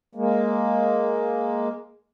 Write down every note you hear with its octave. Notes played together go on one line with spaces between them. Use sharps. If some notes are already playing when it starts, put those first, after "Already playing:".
G#3 A#3